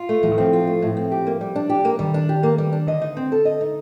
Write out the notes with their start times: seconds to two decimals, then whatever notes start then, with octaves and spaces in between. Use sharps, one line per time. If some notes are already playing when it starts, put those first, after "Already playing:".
Already playing: F4
0.09 A3
0.23 A2 F3
0.32 D#3
0.38 F3 C4
0.53 F4
0.67 A3
0.82 A2
0.97 C4
1.12 G4
1.27 A#3
1.41 G3
1.55 D4
1.69 G4
1.85 A#3
1.99 D#3 G3
2.14 D4
2.29 G4
2.43 A#3
2.58 G3
2.73 D4
2.87 D3 D#5
3.02 D#4
3.17 C4
3.32 A4
3.45 D#5
3.61 D#4